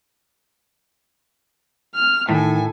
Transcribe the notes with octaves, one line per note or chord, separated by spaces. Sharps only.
F6
A2 D#3 A4 G#5